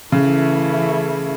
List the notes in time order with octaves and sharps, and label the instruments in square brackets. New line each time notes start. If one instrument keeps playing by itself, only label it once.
[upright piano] C#3 [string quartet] E3 A3 E4